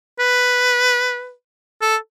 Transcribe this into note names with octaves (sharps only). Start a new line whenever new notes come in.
B4
A4